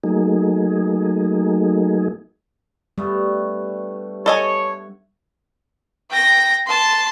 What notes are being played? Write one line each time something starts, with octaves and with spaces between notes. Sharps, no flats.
F#3 A3 A#3 D#4 G#4
G2 G3 A3 B3
A4 C#5 D#5 G#5
G5 A#6
A5 C6